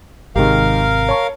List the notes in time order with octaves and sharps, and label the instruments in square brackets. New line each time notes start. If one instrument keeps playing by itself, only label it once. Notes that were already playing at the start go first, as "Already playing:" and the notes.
[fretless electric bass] G#1 C3 [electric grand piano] D#3 G#3 G4 [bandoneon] A#4 F5
[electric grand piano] C#5 A5 C#6